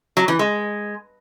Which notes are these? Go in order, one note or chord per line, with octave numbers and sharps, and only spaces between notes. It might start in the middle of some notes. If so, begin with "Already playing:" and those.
F#3
E3
G#3